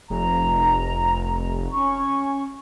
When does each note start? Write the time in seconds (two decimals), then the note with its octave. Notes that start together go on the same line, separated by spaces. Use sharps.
0.10 F1 A#5
1.72 C#4 C#6